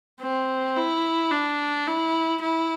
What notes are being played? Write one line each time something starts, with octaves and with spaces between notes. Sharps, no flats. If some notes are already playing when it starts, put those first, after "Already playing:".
C4
E4
D4
E4
E4